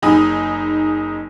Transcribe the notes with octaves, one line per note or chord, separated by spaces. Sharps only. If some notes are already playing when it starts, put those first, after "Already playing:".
F#1 D#4 G#4 B5 D#6